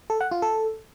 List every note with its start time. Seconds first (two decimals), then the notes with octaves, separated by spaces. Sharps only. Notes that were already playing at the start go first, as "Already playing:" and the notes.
0.10 A4
0.21 F#5
0.31 F4
0.42 A4